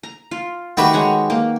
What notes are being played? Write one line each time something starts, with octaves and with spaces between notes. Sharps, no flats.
A#5
F4
D#3 A3 F#4 G4 B4
G#3 C#5 F#5
A#3